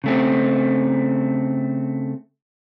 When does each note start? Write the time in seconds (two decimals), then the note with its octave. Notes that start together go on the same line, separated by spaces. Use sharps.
0.04 C#3 A3 C4